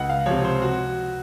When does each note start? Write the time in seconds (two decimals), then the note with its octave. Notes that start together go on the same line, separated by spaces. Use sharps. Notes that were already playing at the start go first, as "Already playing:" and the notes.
Already playing: C#2 F#5
0.10 F5
0.26 C3 F3 C#5
0.45 C5
0.62 F#4